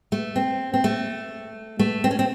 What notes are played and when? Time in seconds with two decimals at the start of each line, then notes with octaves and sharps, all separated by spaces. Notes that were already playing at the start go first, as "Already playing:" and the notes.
0.12 A3
0.36 C4
0.74 C4
0.84 A3
1.79 A3
2.04 C4
2.11 C#4
2.19 C4